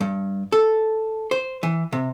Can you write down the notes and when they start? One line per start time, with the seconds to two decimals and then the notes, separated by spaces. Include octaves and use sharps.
0.01 G2
0.52 A4
1.31 C5
1.63 E3
1.92 C3